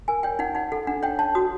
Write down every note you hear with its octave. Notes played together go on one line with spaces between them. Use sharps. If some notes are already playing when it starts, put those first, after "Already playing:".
A#4 G#5
C#5 G5
D#4 F#5
D#4 F#5
A4 F#5
D4 F#5
C#5 G5
C#5 A5
F#4 D#6